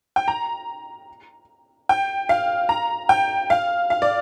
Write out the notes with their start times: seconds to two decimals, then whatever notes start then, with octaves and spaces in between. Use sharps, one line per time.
0.16 G5
0.28 A#5
1.89 G5
2.29 F5
2.69 A#5
3.09 G5
3.50 F5
3.90 F5
4.02 D5